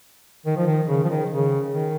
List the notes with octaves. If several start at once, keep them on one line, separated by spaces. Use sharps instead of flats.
D#3
F3
D#3
C#3
F3
D#3
C#3
D#3